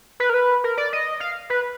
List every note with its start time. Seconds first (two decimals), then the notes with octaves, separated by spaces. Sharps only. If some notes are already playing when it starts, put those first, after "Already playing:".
0.20 B4
0.30 A#4
0.34 B4
0.64 A#4
0.78 D5
0.93 D#5
1.20 F5
1.50 B4